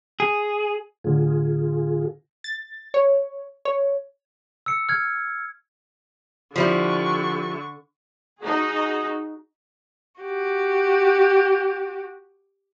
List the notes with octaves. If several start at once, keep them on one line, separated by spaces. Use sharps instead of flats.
G#4
A2 D3 F4 G#4
A6
C#5
C#5
E6 C#7
F6 G#6
D3 F3 G3 E4 C#6
D#4 F#4 G#4
F#4 G4